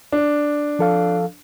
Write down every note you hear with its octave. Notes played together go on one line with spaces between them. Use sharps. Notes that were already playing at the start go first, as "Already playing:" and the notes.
D4
F3 A4 F5